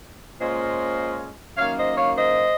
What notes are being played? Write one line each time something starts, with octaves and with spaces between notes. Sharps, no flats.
A#2 G#3 C#4 F4 C5 D#5
F#2 D#3 A#3 C#5 F5
C5 D#5
C#5 F5
C5 D#5